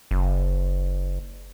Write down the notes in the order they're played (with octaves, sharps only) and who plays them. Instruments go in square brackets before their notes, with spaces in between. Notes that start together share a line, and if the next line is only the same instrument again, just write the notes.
[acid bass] F#1